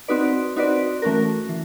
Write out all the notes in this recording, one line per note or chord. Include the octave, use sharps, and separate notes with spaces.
C4 D#4 F#4 B4 D5
C4 D#4 F#4 B4 D5
E3 A3 C#4 F#4 A#4
E3